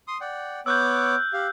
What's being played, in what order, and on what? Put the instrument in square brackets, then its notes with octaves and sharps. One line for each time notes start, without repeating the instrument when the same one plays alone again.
[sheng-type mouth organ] C6 D#6
D5 F#5 G5
[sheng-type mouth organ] B3 C#5 D6 [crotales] E6 F#6 G6
[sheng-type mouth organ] G4 F5